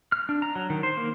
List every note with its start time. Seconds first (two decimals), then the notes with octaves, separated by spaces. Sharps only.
0.12 F6
0.29 D4
0.42 A#5
0.56 F#3
0.70 D#3
0.83 C5
0.97 A#3